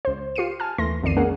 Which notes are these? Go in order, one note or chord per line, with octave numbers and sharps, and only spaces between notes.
C#2 C5
F4 G4 C7 C#7 D#7
G#5 A5 F6
D#2 E3 A3 C6 A#6
B1 F2 D#3 D5 C7 D#7
G#3 A#3 C#4 G#4 A#4 F#5